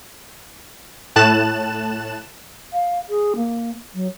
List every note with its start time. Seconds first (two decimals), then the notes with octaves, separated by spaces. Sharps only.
1.16 A2 A5 F#6 E7
2.73 F5
3.10 G#4
3.36 A#3
3.94 F#3